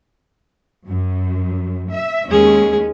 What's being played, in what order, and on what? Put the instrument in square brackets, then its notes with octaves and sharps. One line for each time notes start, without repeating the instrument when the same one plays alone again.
[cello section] F#2
E5
[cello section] D#2 G#3 C#4 [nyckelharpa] G#4